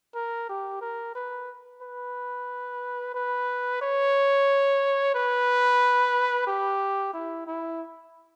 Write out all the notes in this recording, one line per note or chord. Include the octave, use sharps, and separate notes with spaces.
A#4
G4
A#4
B4
B4
B4
C#5
B4
G4
E4
E4